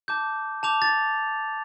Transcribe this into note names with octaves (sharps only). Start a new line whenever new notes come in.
A5 D6 G6
A5 D6 G6 F7
A6